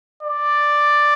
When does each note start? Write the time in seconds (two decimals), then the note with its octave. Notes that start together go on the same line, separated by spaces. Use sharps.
0.23 D5